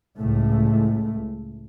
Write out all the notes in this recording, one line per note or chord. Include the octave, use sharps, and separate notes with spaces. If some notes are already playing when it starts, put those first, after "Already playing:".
C#2 A2 A3